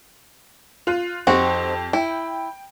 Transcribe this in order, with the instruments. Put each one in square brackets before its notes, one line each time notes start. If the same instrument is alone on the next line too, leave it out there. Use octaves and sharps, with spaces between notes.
[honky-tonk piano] F4 F#6 D#7
[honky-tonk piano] F2 G4 [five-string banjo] C4 D#4 F#4
[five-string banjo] E4 [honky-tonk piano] G5